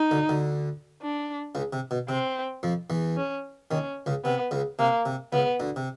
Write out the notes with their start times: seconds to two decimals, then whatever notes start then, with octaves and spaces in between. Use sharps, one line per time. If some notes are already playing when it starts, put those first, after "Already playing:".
Already playing: D#4
0.11 D2 D3
0.29 D2 D3
1.02 D4
1.55 C#2 C#3
1.73 C3
1.91 B2
2.09 C3 C4
2.63 F2 F3
2.90 E2 E3
3.17 C#4
3.71 D#2 D#3 C#4
4.06 C#2 C#3
4.25 C3 B3
4.51 C#2 C#3
4.79 C3 A#3
5.06 C3
5.33 C#2 C#3 B3
5.60 D2 D3
5.76 C3